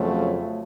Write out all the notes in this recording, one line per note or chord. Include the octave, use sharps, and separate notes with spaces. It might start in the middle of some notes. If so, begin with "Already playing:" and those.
Already playing: F2 C#3 F#3 A3